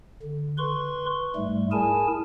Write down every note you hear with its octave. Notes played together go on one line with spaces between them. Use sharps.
D3
B4 C6 C#6
G#2 G3 A3
E4 G#4 A#4 G#5 A5